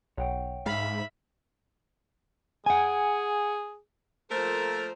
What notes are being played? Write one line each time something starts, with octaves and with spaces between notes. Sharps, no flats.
B1 C#5 F#5 G5
G#2 E5 F5 B5
G#4 F#5 G#5
F3 A3 A#3 A4 A#4 C5